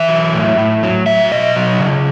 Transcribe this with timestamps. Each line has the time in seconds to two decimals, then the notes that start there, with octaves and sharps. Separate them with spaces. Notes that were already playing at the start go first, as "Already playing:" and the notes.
Already playing: E3 E5
0.09 F#3
0.34 A2
0.58 A2
0.83 F#3
1.06 F#3 E5
1.32 B2 D#5
1.56 F#3
1.79 C#3